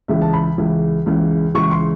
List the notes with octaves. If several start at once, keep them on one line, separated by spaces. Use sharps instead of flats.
C#2 C#3 E3 E5
A5
B5
C#2 C#3 E3
C#2 C#3 E3
C#2 C#3 E3 C#6
C6